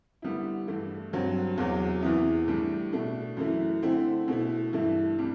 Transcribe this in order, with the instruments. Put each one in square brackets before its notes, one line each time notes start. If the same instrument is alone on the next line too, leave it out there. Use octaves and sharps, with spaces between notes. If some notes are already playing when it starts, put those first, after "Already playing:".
[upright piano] D3 G3 B3 E4
G2 E3 A3 E4
G2 F#3 C4
E2 C3 F#3
E2 C3 E3 B3 E4
A2 E3 G3 D4
B2 A3 D4
F#2 E3 A3 E4
D3 A3 C4 E4
B2 A3 E4
G2 E3 A3 E4
C3 G3 D4